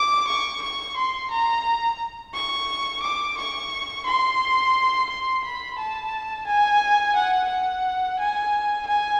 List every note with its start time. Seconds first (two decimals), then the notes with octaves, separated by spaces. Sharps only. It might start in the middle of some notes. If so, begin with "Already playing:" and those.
Already playing: D6
0.27 C#6
0.62 C#6
0.96 C6
1.31 A#5
2.34 C#6
3.03 D6
3.37 C#6
4.06 C6
5.09 C6
5.44 B5
5.78 A5
6.47 G#5
7.15 F#5
7.50 F#5
8.19 G#5
8.87 G#5